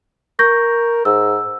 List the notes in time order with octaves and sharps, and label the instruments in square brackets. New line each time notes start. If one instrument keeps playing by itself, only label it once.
[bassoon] A#4 [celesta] C#6 G6 A#6
[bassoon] G#2 [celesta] E6